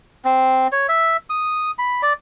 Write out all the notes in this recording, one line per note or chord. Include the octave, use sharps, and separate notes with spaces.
C4
C#5
E5
D#6
B5
D5